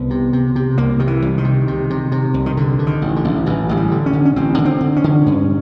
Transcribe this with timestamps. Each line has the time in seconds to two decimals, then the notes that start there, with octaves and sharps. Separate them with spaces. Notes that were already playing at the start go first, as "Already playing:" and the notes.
Already playing: C2 B3
0.10 C3
0.33 C3
0.56 C3
0.78 C2 A#3
0.99 C3 D#3
1.07 E3
1.22 C2
1.38 D#3
1.45 C3
1.68 C3
1.90 C3
2.12 C3
2.34 C2
2.46 D#3
2.57 G2 D3
2.79 D3
2.87 D#3
3.02 A1
3.16 D3
3.24 A1
3.46 A1 E3
3.69 A1 G#3
3.77 G3
3.91 D3
4.06 C#4
4.13 D3
4.25 C#4
4.36 A1 C4
4.58 D3
4.65 C4
4.80 D3
4.96 C#4
5.04 D3
5.26 G2